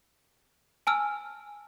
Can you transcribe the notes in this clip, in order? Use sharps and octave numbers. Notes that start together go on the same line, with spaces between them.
G#5 A5 E6 F6